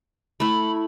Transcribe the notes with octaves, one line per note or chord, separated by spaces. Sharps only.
A3 E4 B5